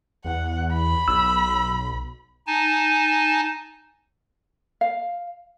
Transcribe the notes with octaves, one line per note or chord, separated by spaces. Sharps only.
E2 F#5
B5
B1 E6
D#4 G#5 A5
F5